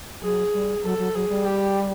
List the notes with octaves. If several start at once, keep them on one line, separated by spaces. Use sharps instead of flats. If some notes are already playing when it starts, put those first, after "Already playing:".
F#3 G#4
G3
F#3 A4
F#3
F#3 G#4
G3
G4